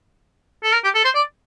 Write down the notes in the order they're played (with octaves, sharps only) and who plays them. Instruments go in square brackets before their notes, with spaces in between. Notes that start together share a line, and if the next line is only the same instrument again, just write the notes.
[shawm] A4
A#4
G4
A4
C5
D5